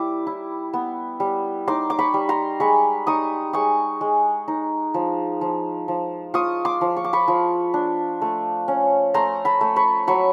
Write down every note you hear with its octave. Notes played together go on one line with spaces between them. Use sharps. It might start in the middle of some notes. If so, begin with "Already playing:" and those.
Already playing: G3 E4 D6
E4
B3
G3
D#4 C6 D6
D6
B5 C#6
G3
A#5 C6
G#3 B5 C#6
D#4 C#6 D#6
G#3 C#6 D#6
G#3
D#4
F3
F3
F3
F4 C#6 D#6
C6 D6
F3
C#6
D6
B5 C#6
F3
D4
A3
C#4
A3 A#5 C6
A5 B5
A3
B5 C#6
F#3 B5 C#6